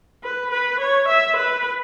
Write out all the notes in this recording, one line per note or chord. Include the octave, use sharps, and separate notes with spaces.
B4
B4
C#5
E5
B4